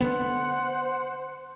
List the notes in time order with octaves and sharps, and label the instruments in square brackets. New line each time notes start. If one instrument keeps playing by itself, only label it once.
[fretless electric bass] D3 B3 [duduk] C5 [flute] F#5